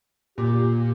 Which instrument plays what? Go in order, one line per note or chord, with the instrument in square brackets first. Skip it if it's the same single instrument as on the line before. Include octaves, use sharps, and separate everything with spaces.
[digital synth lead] A#2 [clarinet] G4